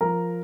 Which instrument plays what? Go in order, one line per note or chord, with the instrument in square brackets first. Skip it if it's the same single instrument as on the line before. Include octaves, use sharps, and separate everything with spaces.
[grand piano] F3 A#4 A#5